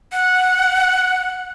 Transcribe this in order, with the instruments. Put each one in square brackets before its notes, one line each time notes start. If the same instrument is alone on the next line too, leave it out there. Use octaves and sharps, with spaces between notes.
[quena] F#5